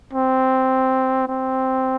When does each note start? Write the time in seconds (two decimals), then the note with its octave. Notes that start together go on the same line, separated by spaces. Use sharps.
0.13 C4
1.28 C4